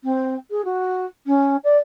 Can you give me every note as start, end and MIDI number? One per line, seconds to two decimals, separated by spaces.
0.04 0.35 60
0.51 0.64 68
0.65 1.06 66
1.27 1.56 61
1.64 1.77 74